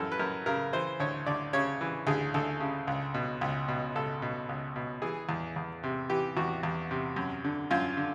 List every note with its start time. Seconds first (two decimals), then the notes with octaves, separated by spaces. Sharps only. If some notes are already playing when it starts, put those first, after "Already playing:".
Already playing: F#2 E3 A4 A#4
0.12 B4
0.19 F#2 A#4
0.46 C#3 A#4
0.73 E3 C5
1.00 D2 C#5
1.26 D2 D5
1.53 C#3 C#5
1.81 E3
2.07 D2 G#4
2.34 D2 A4
2.60 C#3
2.87 C#2
3.14 B2
3.41 C#2
3.68 B2
3.96 C#2 A4
4.22 B2
4.49 C#2
4.76 B2
5.02 E3 G#4
5.29 E2
5.56 E2
5.83 C3
6.10 E3 G4
6.37 E2 F#4
6.63 E2
6.91 C3
7.16 F#2
7.44 D3
7.71 F#2 F4
7.97 D3